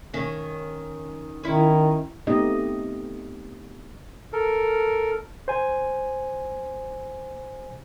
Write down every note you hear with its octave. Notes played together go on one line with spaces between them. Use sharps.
D#3 C#4
D#3 C#4 E4
A3 B3 C4 D#4 G4 D#5
A4 A#4
C5 G#5